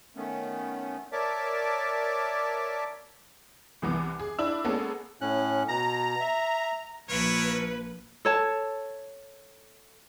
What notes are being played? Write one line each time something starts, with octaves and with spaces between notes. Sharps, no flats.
D#3 A3 B3 C#4
A#4 C#5 D5 E5 A5 D6
C2 E3 B3 D6
G#4
D4 E4 E6
G#3 A#3 B3 C#4 G#4 A4
A2 C#4 F#6
B2 A#5
E5
A#1 F3 A#3 E4 A#4 B4 C#5
A4 C#5 A5